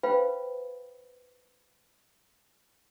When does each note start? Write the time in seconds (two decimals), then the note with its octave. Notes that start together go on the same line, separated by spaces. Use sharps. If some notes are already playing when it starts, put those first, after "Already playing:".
0.03 B4 C5 F5 G5 B5